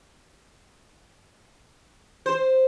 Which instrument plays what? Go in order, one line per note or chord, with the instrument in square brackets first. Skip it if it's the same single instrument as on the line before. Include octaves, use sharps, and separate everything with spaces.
[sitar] C5